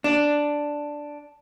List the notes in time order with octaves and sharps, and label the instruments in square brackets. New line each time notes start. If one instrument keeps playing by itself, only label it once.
[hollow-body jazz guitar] D4